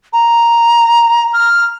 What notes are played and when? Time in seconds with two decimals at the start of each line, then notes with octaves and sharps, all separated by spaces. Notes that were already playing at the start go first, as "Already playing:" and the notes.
0.13 A#5
1.33 F6